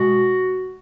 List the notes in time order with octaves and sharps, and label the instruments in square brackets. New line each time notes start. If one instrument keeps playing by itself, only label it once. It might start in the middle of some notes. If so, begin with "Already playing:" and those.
Already playing: [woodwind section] B2 G#3 F#4